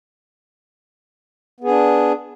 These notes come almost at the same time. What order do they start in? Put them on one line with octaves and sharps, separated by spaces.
B3 G#4 D4